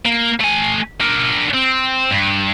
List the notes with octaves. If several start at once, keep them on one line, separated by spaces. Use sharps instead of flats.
A#3
A3 G#5
D4 A#4
C4
G2